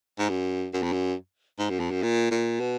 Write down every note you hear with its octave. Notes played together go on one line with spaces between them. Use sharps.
G#2
F#2
F#2
F2
F#2
G#2
F#2
F2
F#2
A#2
A#2
B2